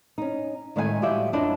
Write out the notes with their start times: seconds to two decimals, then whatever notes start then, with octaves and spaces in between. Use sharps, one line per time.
0.18 C#4 D#4
0.76 A2 D#3 G#3 E5 F5 G#5
1.02 F3 G3 F#4 G4 D5 E5
1.33 F#2 D4 E4 F4 D#5